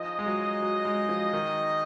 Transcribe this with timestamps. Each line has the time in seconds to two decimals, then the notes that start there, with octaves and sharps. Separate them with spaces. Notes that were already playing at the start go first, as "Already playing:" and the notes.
Already playing: F3 D#4 G#4 D#5
0.19 G#3
0.26 F#3
0.62 F#3
0.85 G#3
1.09 F3
1.33 D#3